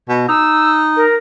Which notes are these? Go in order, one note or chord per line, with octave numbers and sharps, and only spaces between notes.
B2
D#4 E6
A#4